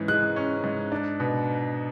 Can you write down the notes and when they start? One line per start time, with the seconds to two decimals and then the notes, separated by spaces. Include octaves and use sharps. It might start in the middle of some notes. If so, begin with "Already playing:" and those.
Already playing: G#2 E3 C#4
0.08 G#3 F#6
0.36 C#4
0.64 G#2
0.92 D4
1.20 B2